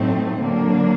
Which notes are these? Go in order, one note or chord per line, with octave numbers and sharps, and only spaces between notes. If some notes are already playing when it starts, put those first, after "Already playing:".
Already playing: A2 F#3 A3 C4 D#4
D3 F#3 A#3 D4